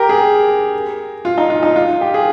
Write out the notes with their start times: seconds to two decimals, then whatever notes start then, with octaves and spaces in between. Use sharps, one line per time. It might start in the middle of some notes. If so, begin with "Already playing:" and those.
Already playing: G4 A#4
0.09 G#4
1.25 F4
1.38 D#4
1.50 F4
1.63 D#4
1.76 F4
2.01 G4
2.14 G#4